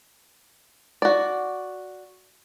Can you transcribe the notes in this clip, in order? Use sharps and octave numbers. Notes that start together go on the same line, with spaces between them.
F#4 D5